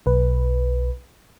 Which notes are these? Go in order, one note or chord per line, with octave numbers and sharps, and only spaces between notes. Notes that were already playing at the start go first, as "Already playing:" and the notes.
B1 B4